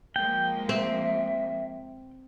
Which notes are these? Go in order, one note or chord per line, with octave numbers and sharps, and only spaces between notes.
F3 G#3 A#3 G5
C4 E5